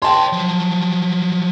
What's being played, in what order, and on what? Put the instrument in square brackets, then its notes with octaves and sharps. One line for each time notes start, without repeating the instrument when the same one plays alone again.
[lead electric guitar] C#5 D#5 [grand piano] G5 A5 C6
[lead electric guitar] F3 F#3